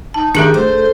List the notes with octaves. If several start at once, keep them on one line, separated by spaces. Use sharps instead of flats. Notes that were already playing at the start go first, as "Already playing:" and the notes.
D#4 A5
D#3 D4 G4 G#4 E5
A3 C5